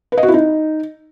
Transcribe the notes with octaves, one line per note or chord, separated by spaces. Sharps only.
B4
D#5
F#4
E4
D#4